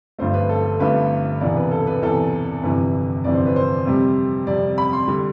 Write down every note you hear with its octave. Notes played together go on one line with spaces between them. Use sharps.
G1 G2 F3 A3 C5
B4
A4
A4
G1 G2 F3 A3 B4
E1 E2 C3 D5
B4
A4
B4
E1 E2 C3 A4
G1 F2 C3 E3 B4
G1 F2 C3 E3 D5
C5
B4
C5
F2 C3 G3
F2 C3 G3 D5
B5
C6
D3 G3